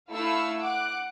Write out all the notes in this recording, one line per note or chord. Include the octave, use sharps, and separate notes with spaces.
A3 E4 F5 E6 C#7
F#5 D6 F#6